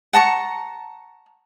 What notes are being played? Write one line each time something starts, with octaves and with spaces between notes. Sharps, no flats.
F#5 A5 A#5 C#6